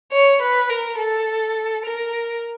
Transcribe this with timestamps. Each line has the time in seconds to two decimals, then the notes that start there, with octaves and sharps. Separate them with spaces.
0.12 C#5
0.41 B4
0.69 A#4
0.98 A4
1.85 A#4